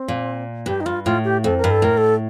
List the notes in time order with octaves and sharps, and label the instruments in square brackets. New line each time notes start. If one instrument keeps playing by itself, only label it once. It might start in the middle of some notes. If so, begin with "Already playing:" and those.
Already playing: [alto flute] C4
[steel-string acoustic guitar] A#2
[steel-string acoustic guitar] G2 [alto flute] G4
[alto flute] D#4
[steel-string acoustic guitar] G2 [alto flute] F4
[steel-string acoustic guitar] A2 [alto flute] F4
[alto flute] G4
[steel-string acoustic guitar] F2 [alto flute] A4
[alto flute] A#4
[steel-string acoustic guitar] G2
[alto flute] A4
[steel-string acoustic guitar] A2 [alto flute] A#4
[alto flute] A4